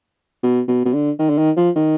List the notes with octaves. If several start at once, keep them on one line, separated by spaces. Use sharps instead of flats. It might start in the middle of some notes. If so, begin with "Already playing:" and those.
B2
B2
B2
D3
D#3
D3
D#3
F3
D#3